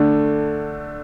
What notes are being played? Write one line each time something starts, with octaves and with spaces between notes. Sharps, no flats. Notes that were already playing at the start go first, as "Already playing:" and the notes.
Already playing: D3 A3 D4